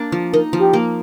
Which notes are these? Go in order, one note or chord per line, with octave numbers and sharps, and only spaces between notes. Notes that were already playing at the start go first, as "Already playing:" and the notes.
Already playing: A#3 D4
F3
D#4 A#4
F3
G4
A#3